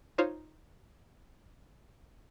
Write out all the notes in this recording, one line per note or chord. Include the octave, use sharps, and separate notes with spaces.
D#4 F4 C5 C#5 F5